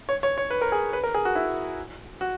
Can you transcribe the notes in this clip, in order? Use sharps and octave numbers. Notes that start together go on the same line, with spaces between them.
C#5
C#5
C#5
B4
A#4
G#4
B4
A#4
G#4
F#4
E4
F#4